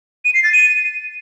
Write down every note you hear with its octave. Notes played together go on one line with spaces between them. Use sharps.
D#7
C7
A6
D#7